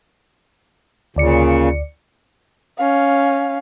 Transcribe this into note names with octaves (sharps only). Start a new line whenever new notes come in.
D2 A#2 C#3 D5 C#7
C#4 F5